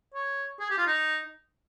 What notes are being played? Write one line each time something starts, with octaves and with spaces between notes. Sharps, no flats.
C#5
G#4
G4
F4
D#4